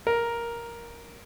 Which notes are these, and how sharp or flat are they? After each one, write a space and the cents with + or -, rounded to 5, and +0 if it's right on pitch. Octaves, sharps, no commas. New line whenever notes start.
A#4 +5